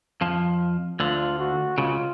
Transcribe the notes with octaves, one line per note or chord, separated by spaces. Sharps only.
F2 F3
D2 D3 F4
F#4
C#2 C#3 F4